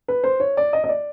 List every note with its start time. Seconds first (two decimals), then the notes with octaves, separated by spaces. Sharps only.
0.08 B4
0.24 C5
0.40 C#5
0.57 D5
0.73 D#5
0.84 D#5
0.89 D5